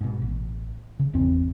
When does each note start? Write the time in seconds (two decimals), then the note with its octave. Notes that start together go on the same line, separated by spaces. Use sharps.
0.01 G#2 B2
0.22 A1
0.99 C#3
1.13 G#1 E2 G#2 C4